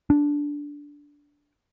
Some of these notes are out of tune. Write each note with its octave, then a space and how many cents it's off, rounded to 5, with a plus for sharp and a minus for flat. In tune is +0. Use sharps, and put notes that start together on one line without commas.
D4 -10